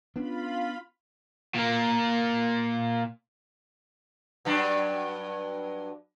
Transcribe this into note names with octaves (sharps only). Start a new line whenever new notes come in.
B3 C#4 D4 F4 B5
A#2 A#3
G2 F#3 D4